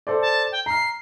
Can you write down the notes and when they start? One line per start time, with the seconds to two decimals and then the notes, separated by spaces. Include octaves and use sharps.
0.07 A4 C5 D5
0.22 A5
0.52 G5
0.66 A#5 F6 C7